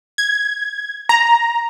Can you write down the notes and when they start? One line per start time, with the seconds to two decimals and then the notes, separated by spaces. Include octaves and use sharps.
0.18 G#6
1.09 A#5